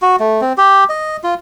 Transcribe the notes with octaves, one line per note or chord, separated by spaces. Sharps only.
F#4
A3
C4
G4
D#5
F4